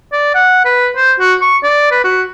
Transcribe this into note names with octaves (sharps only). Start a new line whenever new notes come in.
D5
F#5
B4
C5
F#4
C#6
D5
B4
F#4